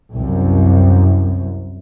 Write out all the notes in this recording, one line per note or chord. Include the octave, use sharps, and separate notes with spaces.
C2 F#2